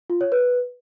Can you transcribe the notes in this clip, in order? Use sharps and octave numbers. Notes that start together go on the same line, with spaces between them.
F4
C#5
B4